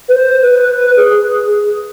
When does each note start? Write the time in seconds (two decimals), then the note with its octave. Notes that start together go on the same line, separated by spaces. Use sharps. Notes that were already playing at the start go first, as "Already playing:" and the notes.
0.08 B4
0.14 C5
0.41 B4
0.96 G#4